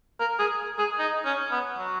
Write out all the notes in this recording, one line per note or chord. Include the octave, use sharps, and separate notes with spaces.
A#4
G#4
G#4
D#4
C#4
B3
F#3